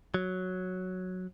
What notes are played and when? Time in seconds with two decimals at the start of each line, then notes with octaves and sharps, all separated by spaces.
0.14 F#3